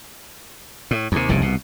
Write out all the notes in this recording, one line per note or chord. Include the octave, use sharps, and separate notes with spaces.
A2
D#2 C3
F1 C2 G2 C#3
C2 B2